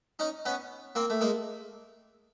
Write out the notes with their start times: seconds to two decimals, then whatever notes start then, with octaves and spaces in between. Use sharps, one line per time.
0.19 C#4 D#4
0.45 B3 C#4
0.95 A#3 C4
1.10 A3
1.21 G#3 A#3